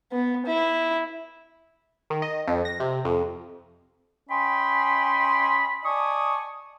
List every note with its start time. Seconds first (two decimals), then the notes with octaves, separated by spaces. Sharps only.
0.12 B3
0.46 E4
2.10 D#3
2.22 D#5
2.48 F2
2.65 A#6
2.80 C3
3.05 F2
4.30 C#4 D#5 G5 G#5 B5 C6
5.84 D5 D#5 G#5 A5 C#6 D#6